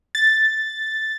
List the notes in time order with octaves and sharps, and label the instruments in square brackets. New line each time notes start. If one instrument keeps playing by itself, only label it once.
[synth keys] A6